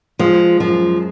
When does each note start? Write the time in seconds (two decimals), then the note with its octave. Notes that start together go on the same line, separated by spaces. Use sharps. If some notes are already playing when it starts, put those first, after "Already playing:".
0.19 F3 G#3
0.60 F#2 F3